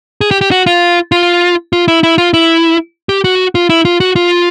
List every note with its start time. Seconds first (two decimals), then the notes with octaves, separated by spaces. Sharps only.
0.21 G#4
0.31 G4
0.41 G4
0.51 F#4
0.66 F4
1.12 F4
1.73 F4
1.88 E4
2.03 E4
2.18 F4
2.34 E4
3.09 G4
3.24 F#4
3.55 F4
3.69 E4
3.85 F4
4.00 F#4
4.16 F4